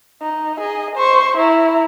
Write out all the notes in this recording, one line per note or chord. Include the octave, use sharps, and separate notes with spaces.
D#4
G#4 D#5
C5 C#6
E4 A#5